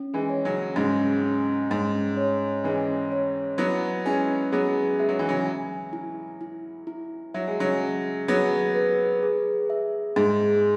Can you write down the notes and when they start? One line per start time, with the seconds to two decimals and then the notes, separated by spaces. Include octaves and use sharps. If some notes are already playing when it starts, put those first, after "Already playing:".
Already playing: C#4
0.14 E3 G#3
0.30 C#5
0.45 C#3 F#3
0.76 G#2 C#3 C#4
1.23 C#4
1.70 G#2 C#4
2.17 C#5
2.64 E3 G#3 C#4
3.12 C#5
3.58 F#3 B3 E4
4.05 G#3 C#4 E4
4.52 F#3 B3 G#4
4.99 G#3 E5
5.09 F#3
5.19 E3
5.29 C#3 F#3
5.47 G#5
5.93 E4
6.41 E4
6.87 E4
7.34 F#3 E5
7.47 G#3
7.60 C#3 F#3
7.82 G#4
8.28 F#3 B3 G#4
8.75 B4
9.23 G#4
9.70 E5
10.16 G#2 G#4